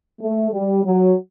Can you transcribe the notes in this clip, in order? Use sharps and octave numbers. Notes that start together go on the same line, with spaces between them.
A3
G3
F#3